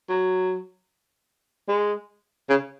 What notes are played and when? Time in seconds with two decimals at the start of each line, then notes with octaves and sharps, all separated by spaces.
0.09 F#3
1.69 G#3
2.49 C#3